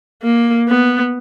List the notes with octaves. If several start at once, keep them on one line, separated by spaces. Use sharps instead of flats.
A#3
B3